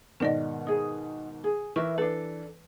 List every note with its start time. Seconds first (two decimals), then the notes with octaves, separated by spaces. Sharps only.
0.20 G#2 B2 D#3 A#4 D5 D#5
0.67 D#4 G#4
1.44 G#4
1.76 E3 A#4 B4 E5 C#6
1.98 D4 A4 B4